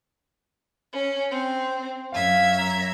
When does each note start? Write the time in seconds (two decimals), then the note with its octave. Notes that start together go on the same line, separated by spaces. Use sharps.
0.94 C#4
1.31 C4
2.12 F#2 E5 F5 G#6
2.59 A#5